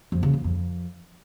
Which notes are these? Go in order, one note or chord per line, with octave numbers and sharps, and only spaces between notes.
F2
C#3
F2
F2